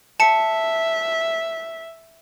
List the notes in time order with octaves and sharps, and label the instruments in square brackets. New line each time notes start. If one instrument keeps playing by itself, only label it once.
[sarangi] E5 [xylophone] A5 C#7